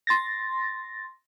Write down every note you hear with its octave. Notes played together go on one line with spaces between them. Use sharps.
C6 A6 A#6